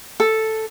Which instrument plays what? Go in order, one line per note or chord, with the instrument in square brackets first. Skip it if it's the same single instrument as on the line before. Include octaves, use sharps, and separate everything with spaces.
[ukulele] A4